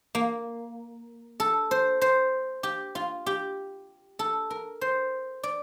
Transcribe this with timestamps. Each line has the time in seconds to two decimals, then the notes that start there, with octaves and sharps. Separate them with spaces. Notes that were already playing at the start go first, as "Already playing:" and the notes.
0.15 A#3
1.40 A4
1.71 C5
2.01 C5
2.63 G4
2.95 F4
3.26 G4
4.19 A4
4.50 A#4
4.81 C5
5.43 D5